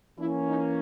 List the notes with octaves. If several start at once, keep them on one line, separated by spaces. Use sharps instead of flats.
E3 A#3 C#4 E4
D#4